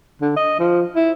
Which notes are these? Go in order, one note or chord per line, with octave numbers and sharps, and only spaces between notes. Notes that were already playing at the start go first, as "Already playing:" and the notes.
D3
D#5
F3
E4